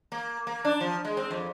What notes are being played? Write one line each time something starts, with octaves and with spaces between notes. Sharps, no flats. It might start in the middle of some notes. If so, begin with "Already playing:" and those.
A#3
A#3
D4
F3
G#3
C4
F2